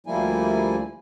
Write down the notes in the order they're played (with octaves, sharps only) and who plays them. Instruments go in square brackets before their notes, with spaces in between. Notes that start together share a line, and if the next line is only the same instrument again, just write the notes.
[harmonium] D2 F3 G3 A#3 E4 G#5